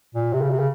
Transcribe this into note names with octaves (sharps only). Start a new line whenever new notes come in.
A#2
C3
C#3
C3
C#3